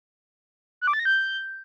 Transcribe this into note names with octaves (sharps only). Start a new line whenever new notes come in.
F#6
D6
A6
A#6
G6